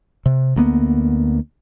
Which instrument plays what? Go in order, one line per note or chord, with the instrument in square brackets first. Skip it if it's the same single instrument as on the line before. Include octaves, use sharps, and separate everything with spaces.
[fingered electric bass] C3
D2 A#3 B3